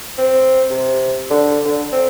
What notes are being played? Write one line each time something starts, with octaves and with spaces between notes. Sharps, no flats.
C4
C3
D3
D3
C4